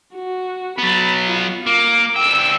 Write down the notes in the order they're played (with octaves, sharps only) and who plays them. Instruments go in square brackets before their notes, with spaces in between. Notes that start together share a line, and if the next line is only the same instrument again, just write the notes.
[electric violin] F#4
[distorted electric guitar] F#3 B3 [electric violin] B5 A6
[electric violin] F4
[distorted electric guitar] A#3 [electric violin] D6
[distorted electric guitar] D2 G5 [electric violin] E6